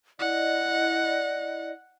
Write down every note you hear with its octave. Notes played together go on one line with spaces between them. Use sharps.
E4 D5 D#5 F#5